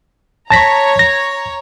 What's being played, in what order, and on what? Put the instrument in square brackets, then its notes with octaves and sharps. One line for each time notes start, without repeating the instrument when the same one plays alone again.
[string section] C#5 A#5 [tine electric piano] A5 A#6 B6
[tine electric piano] A#6